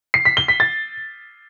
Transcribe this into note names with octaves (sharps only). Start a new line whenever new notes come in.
C7
B6
G7
B6
A6